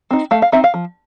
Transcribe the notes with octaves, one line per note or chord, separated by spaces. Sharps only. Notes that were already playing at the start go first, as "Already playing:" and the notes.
C4 D#4
A3 F5
F5
C4 D#4 E5
F5
F3